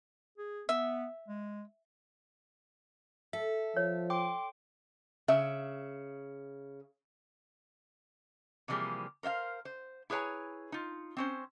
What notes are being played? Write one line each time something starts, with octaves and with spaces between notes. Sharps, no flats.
G#4
B3 E5
G#3
A4 E5
F3 C#5
G5 C6 D6
C#3 E5
C3 E3 F3 G3 A#3 G#4
A#4 C5 E5 F5
C5
E4 G#4 B4 C#5 G#5 A#5
D#4 F4
C4 C#4 C5